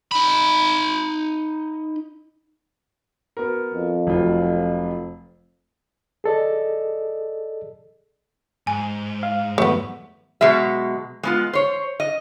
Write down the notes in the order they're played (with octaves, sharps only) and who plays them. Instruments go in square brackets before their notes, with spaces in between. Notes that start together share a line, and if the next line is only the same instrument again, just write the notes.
[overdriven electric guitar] D#4 B5
[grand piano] B3 F#4 A#4
[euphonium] F2
[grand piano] F1 F#3 F4
[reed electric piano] G#4 A4 D5 D#5
[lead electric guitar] G#2 [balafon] G#5
[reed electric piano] F5
[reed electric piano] F2 D#3 F#3 [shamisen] A3 B3
[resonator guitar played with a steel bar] B2 F#3 G#3 E5
G#3 B3 F4
C5 C#5
D#5